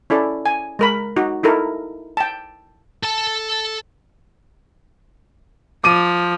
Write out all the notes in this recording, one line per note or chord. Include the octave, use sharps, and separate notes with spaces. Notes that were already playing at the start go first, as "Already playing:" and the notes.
C#4 E4 A4 D5
G#5
G#3 A#4 B5
D#4 F#4
D#4 E4 A4 A#4
G5 A5
A4 A5
F3 D6 D#7